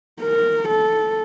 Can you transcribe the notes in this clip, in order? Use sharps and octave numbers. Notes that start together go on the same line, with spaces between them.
A#4
A4